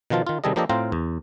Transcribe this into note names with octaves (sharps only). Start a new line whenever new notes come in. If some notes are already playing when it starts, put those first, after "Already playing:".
B2 D#3 F3 F4 A5
D#3 F4
C3 D#3 G3 G#4 A4 D#5
F3 A#3 D4 G4 A4 D#5
A2 C4 F4 F5 G5 A#5
E2